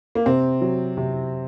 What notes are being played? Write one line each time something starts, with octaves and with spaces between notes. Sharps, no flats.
A#3
C3 C4
F#3
C3